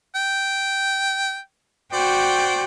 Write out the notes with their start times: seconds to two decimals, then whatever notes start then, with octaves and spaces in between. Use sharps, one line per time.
0.16 G5
1.93 F#4 C5 D5 G5